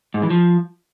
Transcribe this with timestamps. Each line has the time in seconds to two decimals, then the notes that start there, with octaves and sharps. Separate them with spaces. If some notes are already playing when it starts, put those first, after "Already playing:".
0.14 G#2
0.22 E3
0.30 F3